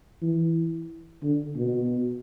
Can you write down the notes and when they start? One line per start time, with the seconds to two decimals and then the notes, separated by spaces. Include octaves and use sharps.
0.22 E3
1.23 D3
1.57 B2